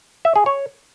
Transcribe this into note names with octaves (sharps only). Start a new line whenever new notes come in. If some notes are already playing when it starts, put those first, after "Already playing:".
E5
G#4
C#5